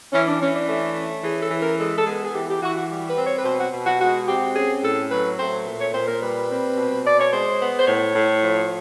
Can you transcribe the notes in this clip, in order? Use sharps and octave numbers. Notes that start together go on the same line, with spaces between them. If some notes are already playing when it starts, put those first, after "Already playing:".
E3 C#4
D4
E3 C#4
D4
A3
C#4
E3 G#4
A4
E3
A#4
G#3 A4
A4
B3 G#4
G#4
E3 G4
G4
E3 F#4
F#4
G3
B4
C4
C#5
B4
B2 C5
F#4
B2
F#4
G#3 F#4
C4 G4
C#4 G#4
A2 A4
F#3 B4
A3 C5
A#2
C#5
A#2 C5
A#4
G3 B4
C4
B2
B2 D5
C#5
G#3 C5
B3
C5
A2 C#5
A2
F3